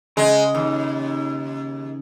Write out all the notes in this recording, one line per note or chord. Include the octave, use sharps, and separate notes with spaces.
C#3 G#3
D#2